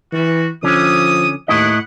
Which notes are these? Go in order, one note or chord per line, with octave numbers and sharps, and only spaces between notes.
E3 G3 F#4
D3 F3 C#4 D#6
D#2 A2 E4 D#5 F#5